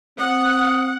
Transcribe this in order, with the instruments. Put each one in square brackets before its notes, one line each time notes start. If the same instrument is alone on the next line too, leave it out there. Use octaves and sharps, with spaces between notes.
[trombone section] C4 [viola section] F#5 [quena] D#6